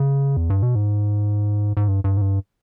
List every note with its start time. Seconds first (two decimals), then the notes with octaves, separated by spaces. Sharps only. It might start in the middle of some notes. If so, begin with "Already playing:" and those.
Already playing: C#3
0.37 E2
0.50 G2
0.63 B2
0.75 G#2
1.77 G#2
1.88 G2
2.04 G2
2.17 G#2
2.21 G2